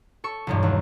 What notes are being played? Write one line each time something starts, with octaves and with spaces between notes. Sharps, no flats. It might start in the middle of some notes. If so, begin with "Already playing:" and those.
A4 C#6
B1 E2 G2
D#2